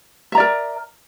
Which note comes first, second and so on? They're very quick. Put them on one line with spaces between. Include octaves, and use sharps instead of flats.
E5 A#5 D5 A#4